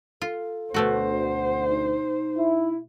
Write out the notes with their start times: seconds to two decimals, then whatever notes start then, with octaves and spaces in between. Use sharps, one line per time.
0.22 F4 A4
0.74 D2 B2 A3 F#4 C5
1.23 F#5
1.68 D#4
2.37 E4